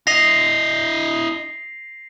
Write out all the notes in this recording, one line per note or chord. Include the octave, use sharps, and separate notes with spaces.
E4 D#5 A#6 C7 F7